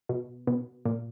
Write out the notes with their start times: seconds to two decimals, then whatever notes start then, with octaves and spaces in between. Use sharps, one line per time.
0.09 B2
0.47 B2
0.85 A#2